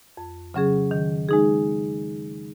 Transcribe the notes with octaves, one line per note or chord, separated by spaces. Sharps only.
F2
C#3 F#3 C#4 G#4
D#3
G#3 D#4 G#4